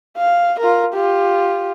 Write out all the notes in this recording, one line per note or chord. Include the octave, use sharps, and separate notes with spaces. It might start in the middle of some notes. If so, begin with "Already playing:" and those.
F5
F4 A#4
F4 G4